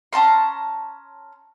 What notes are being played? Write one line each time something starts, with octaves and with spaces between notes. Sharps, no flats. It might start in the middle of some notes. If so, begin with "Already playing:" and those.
C#4 A5 A#5 C6